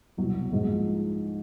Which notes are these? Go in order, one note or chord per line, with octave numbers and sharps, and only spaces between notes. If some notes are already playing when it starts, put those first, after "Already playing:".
C2 B2 F#3
A#1 G#2 F3